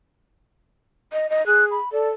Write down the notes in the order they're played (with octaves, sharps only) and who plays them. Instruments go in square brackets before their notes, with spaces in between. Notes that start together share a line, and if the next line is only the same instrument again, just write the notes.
[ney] D#5
D#5
[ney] G#4 [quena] F#6
[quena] B5
[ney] A4 [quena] D5